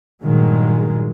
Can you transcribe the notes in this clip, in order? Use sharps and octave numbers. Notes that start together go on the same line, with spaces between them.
G2 A#2 D#3 F#3 G#3